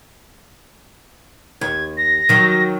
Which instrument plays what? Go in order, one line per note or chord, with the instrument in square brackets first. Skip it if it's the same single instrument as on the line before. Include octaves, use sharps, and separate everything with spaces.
[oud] D#2 [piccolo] G#6
[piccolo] A#6
[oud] D#3 F#3